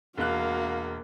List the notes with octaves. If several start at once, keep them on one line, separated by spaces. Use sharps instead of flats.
E1 A#3 F#4 F5 F#6